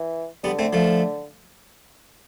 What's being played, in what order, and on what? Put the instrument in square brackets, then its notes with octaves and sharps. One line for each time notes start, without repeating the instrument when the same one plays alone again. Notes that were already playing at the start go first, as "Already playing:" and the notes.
Already playing: [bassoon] E3
[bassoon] D3 [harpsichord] G3 B3
[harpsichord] A3 C4
F3 A3